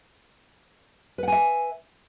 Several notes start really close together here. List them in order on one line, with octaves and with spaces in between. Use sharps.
B4 F#5 G#5 E5